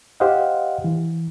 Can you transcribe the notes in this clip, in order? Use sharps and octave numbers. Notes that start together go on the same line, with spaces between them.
G4 C5 D#5 F5 F#5
E3